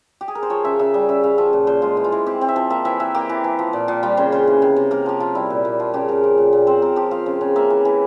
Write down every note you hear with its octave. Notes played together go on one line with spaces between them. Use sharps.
G4
G#4
A#4
C5
F3 C#5
C#3 E5
C#3 E5
G3 E5
C#3 E5
C#3 F5
F3 E5
A#2
A#2 C5
G#3 F4
E3
F4
E3
C4 G4
C4
E5
F3
A#3 E5
E3 E5
E3 E5
A#3 G4
E3
E3
F3
A#2
A#2
G3 F4
C#3 C5
C#3 C5
E3
C3
C3
A#3 A#4
F3 G4
F3 F4
G3 E4
A#2
A#2
F3 F4
C#3 G4
C#3 A#4
F3
A#2
A#2
C4 C5
C4 A#4
F3 G4
F3 F5
C#3
C#3
A#3 E5
E3
E3